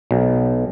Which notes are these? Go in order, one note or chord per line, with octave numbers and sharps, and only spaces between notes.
B1